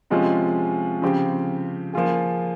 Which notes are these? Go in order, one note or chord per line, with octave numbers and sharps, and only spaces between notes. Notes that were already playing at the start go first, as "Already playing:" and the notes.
C3 F3 G#3 C#4 F4
C#3 F3 C4 G4
F3 A#3 F4 G#4